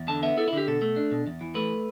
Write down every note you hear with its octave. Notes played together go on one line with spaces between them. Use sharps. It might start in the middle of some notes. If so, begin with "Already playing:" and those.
Already playing: E2
D3 A5
B3 E5
E4 A4
E4
D3 G4
B2 A4
A3
D4
B2
E2
E3
A3 B4